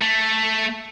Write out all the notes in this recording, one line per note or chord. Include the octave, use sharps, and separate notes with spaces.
A3